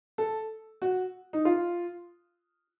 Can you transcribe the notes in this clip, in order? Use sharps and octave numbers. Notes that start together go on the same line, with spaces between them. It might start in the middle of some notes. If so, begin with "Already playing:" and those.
A4
F#4
D#4
F4